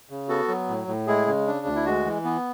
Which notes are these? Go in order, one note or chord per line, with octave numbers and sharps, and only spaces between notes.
C#3
B3 F#4 A4
F#3
A2
A2
G#3 E4 G#4
C#3
D4
D2
E4
G#3 F#4
E3
B3